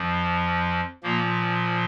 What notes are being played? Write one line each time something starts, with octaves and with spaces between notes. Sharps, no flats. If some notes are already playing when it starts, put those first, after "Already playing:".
Already playing: F2 F3
A#2 F3 A#3